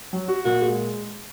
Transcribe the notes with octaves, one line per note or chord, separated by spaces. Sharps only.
F#3
F#4
A#2 F#4
G#3